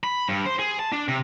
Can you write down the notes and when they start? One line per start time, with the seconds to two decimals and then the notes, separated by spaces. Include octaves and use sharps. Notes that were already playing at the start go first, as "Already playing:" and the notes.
0.04 B5
0.29 G2
0.46 C5
0.59 G#4
0.79 A5
0.92 D4
1.08 C3